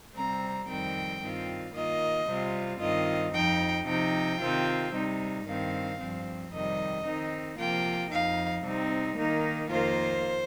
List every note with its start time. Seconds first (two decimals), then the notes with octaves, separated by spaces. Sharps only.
0.15 C3 G3 C4 A#5
0.68 F2 D#3 G3 C4 G5
1.21 G2 D#3 C4 F4
1.74 D#3 A#3 F4 D#5
2.27 C3 G3 C4 F4
2.80 G2 D#3 C4 F4 D#5
3.33 F2 F3 D#4 G5
3.86 C3 F3 D#4 G5
4.40 C3 D#3 C4 F4
4.93 C3 G3 D#4
5.45 G2 D#3 C4 F5
5.99 G2 F3 C4
6.51 F2 C3 D#3 G3 D#5
7.04 D#3 C4 D#4
7.58 C3 F3 A#3 F4 G5
8.11 F2 F3 D#4 F5
8.64 C3 G3 C4 D#4
9.16 D#3 A#3 D#4
9.70 F2 D#3 A#3 F4 C5